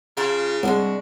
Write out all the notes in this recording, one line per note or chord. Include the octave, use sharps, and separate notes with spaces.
C#3 F4 A5
C2 G#3 D4 F#4